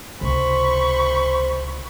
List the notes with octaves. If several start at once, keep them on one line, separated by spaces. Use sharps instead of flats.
C#2 C3 C5 B5 C#6